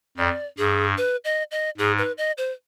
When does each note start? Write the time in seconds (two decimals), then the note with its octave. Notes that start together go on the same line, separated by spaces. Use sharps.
0.17 F2 D5
0.58 G2 G#4
0.98 B4
1.24 D#5
1.51 D#5
1.78 G#2 G#4
1.98 B4
2.18 D#5
2.38 C5